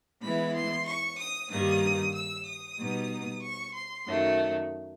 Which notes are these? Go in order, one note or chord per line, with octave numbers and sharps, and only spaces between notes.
E3 G#3 B3 E4 B5
C6
C#6
D#6
G2 D#3 G3 A#3 D#6
E6
D#6
B2 G3 B3 D#4
C#6
C6
F#2 D#3 F#3 A3